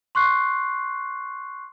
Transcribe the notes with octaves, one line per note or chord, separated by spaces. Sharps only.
C6 C#6 F#6 C7